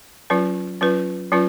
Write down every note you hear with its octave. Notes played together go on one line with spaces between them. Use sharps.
F#3 C#4 F4 B4
F#3 C#4 F4 B4
F#3 C#4 F4 B4